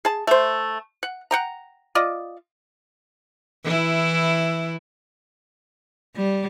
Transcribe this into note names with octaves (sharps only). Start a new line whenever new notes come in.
G#4 A5
A3 C5
F#5
F#5 G5 A#5
F4 D5 D#5
E3 E4
G3